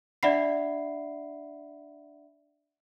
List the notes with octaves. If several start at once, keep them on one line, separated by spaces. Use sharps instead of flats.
D4 D5 E5 F#5 B5 C7